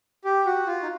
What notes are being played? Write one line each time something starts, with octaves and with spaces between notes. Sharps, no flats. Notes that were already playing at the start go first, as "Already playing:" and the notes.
G4
F#4
F4
D#4